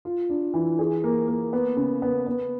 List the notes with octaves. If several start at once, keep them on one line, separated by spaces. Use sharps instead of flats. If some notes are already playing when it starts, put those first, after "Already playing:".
F4
D4
E3
G#4
A#3
A#3
B3
C#3
B3
B3